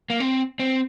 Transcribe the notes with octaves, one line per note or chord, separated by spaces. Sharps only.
A#3
C4
C4